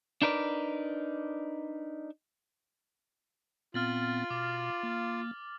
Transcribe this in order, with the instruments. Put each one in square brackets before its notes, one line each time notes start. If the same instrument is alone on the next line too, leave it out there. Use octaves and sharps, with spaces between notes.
[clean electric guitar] D4 D#4 A#4 B4 D5
[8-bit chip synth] A#2 B3 C4 [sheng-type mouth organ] F4 [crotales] F6 A6 F#7
[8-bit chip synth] B2 [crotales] D6
[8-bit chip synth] A#3